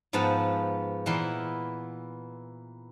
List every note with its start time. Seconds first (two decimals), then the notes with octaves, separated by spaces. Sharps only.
0.13 G#2 F3 B3 F#5 A5
1.06 A#2 E3 B3 E4 A#4 C6